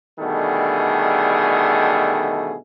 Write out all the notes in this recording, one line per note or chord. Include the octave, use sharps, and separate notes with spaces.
B2 D3 D#3 G3 A3 G#4